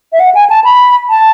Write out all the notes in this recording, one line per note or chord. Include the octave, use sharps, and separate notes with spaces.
E5
F#5
G#5
A5
B5
A5